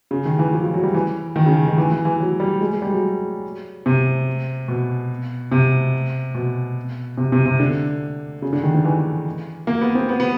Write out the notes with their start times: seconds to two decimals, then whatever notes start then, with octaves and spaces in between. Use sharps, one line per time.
0.11 C#3
0.25 D#3
0.39 E3
0.53 F3
0.64 F3
0.74 F#3
0.84 G3
0.94 E3
1.36 D#3
1.46 C#3
1.68 D#3
1.78 E3
1.91 E3
2.05 E3
2.20 F#3
2.40 G3
2.61 G#3
2.71 G#3
2.82 G3
2.91 F#3
3.86 C3
4.68 B2
5.52 C3
6.35 B2
7.18 C3
7.32 C3
7.46 C3
7.60 D3
8.42 C#3
8.53 D3
8.63 D#3
8.74 D#3
8.84 E3
9.67 A#3
9.81 B3
9.95 C4
10.09 B3
10.20 B3